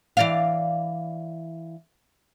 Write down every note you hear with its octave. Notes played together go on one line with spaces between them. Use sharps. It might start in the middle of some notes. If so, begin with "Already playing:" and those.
E3 D5 F5